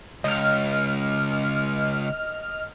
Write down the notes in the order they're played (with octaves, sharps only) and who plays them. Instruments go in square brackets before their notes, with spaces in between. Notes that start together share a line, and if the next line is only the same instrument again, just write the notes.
[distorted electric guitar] C#2 [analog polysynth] D#5 F6